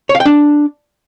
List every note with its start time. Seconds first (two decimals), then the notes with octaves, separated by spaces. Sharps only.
0.09 C#5
0.15 F5
0.20 G5
0.26 D4